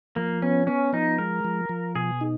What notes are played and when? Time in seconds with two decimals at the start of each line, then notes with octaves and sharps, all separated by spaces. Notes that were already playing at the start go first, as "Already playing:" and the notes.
0.16 F3 A#3
0.42 B3 C#4
0.67 B3 C#4
0.93 F3 D#4
1.18 G#3 A#4
1.44 F3
1.69 F3
1.95 B2 G#4
2.21 D#4